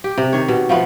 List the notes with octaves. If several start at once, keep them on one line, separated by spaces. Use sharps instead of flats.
G4
C3
D#3 C#5
B2
F3 A3 B3